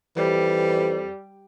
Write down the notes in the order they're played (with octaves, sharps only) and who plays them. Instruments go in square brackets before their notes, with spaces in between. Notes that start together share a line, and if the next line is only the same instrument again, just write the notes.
[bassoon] F2 [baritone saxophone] E3 [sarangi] G3